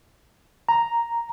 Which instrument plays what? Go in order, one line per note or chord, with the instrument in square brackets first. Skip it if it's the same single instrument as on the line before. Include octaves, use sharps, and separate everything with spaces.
[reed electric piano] A#5